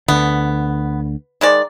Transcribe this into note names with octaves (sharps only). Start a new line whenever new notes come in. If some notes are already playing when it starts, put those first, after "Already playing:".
D2 D3 B3
D#3 G#3 D5